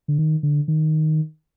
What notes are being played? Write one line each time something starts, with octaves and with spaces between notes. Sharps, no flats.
D3
D#3
D3
D#3